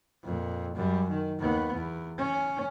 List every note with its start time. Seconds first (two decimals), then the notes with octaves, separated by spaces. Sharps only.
0.24 F2 A#2
0.76 F#2 G3
1.09 D#3
1.39 D#2 B3
1.74 E2
2.18 C#4